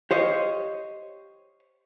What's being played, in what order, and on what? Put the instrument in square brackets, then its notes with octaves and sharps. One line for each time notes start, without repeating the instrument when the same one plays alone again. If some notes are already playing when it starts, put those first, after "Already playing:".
[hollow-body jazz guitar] G4 C5 C#5 D#5 F5